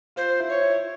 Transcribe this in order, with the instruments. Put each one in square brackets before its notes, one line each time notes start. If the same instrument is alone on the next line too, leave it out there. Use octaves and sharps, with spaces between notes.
[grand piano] F4 [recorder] C5
[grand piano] E4
[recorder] C#5
[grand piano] E4